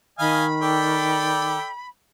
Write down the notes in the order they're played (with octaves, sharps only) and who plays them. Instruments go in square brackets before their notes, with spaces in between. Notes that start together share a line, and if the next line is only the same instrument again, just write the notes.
[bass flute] D#3 [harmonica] D#5 F5 G#5 [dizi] B5
[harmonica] A4 D5 G5